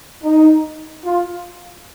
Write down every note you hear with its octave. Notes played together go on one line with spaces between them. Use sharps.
D#4
F4